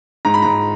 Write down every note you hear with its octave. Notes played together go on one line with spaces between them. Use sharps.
G#2 A#5
B5
G#2 A#5